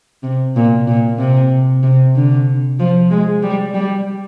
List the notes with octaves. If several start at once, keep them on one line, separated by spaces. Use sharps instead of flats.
C3
A#2
A#2
C3
C3
D3
F3
G#3
G3
G3